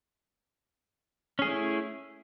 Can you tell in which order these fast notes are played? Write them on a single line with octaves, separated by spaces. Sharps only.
C#4 G#4 A3 E4